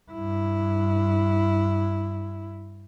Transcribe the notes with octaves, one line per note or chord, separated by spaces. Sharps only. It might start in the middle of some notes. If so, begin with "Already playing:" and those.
G2 E4